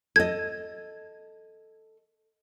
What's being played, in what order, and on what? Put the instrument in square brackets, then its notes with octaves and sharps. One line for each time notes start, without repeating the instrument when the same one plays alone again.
[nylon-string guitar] A4 D#5 [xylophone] G#6